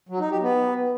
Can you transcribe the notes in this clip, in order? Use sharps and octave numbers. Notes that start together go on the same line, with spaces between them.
F#3
D#4
G4
B3